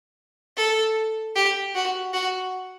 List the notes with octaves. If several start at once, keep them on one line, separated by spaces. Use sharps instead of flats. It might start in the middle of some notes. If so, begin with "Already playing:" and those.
A4
G4
F#4
F#4